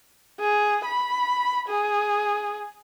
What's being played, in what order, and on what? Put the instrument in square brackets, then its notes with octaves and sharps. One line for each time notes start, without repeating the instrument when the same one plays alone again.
[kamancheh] G#4
B5
G#4